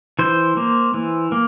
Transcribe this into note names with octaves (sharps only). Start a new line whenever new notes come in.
E3 C5
A#3
E3
A#3